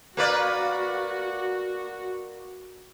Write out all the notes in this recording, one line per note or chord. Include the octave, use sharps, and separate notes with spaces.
A#3 F#4 B4 D5